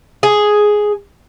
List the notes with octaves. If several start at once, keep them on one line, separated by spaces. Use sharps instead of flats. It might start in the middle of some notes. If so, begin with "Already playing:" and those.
G#4